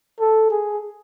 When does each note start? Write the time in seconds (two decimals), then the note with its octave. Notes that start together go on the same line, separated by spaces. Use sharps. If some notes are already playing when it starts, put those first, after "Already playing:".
0.20 A4
0.50 G#4